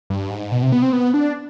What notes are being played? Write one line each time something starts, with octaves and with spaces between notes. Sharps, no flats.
G2
G#2
B2
C3
B3
C4
B3
D4